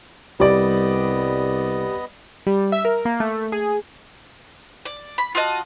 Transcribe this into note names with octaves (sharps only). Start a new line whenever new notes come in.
C2 G3 B3 B4 D5 D#5
G3
E5
A#4
A#3
A3
G#4
D5
B5
F4 F#4 D#5 A5